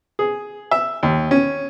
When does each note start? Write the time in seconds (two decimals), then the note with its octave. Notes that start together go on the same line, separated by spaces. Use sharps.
0.19 G#4
0.71 E5
1.03 D#2
1.31 C#4